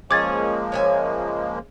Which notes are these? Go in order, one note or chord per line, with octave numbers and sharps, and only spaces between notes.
F3 G#3 A#3 C#4 G#4 D6 G#6 A6
C#3 C#5 E5 G#5